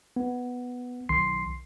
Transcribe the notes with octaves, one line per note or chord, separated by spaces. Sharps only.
B3
B1 D#3 C6 C7